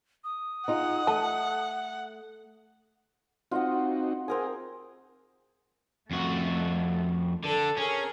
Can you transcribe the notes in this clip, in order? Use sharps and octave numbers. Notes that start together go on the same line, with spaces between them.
D#6
D#4 F4 G#4 F#5
A3 A5
C4 D#4 F4 F#4 D#5 F#5
C4 G#4 A#4 D#6
F2 A3 F#4
D3 A4
C#4 G#4 A#4